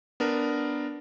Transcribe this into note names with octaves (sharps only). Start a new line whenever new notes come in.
B3 D4 A#4